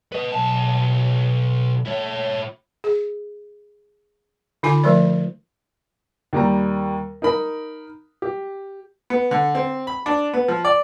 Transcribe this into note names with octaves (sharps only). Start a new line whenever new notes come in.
B4 D#5
B1 A5
E4 C#5
G#4
D3 D#4 F4 G#5 B5 D6
F3 A3 A#4 D5
D#2 G3 A#5
D#4 A#4 B5
G4
B3
D3
C4
B5
D4
B3
F3
D5